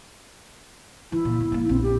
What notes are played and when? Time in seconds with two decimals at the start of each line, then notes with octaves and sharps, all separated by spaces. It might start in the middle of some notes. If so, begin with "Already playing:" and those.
1.12 E3 E4
1.25 A#2
1.40 B3
1.52 F3 A#3
1.69 A#1 C4
1.82 G4